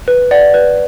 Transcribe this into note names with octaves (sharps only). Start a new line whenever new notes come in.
B4
D5 F#5
B4